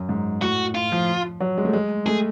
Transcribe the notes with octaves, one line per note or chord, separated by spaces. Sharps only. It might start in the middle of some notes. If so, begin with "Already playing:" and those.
Already playing: F#2
G#2
A2 F#4
F4
F3
F#3
G#3
A3
G#3
A3 G#4